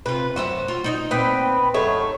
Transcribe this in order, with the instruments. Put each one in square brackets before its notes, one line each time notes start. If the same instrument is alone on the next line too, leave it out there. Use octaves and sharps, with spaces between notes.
[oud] C3 F4 [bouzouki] B4
[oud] F#2 C5 E5 [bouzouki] F#4
[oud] F4
D#4 C#5 D#5
[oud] A#2 C4 [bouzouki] B3 B4 G5
[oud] F#2 [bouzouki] D#3 A3 C#5